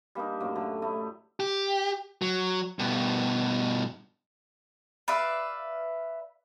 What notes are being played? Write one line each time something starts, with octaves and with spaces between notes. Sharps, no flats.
G3 A#3 D4 D#4
F#2 A2 A3 A#3
D3 F#3 A3
A3 E4 D#5
G4
F#3
G2 B2
B4 D5 E5 F5